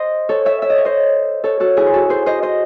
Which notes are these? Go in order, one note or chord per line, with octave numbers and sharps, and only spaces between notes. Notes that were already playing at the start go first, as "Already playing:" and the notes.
Already playing: C5 D#5
A4 C#5
C#5 E5
E5
D#5
C#5
C5 D#5
A4 C#5
F#4 A4
E4 G#4
C5
F#4 A4
G#4 C5
C5 D#5
C5 D#5